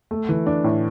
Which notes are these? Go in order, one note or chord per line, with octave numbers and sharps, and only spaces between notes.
A3
E3
D4
A2